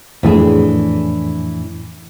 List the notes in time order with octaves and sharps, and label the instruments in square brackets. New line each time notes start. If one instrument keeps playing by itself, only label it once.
[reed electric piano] F2 A2 [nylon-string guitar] E3 D4 G#4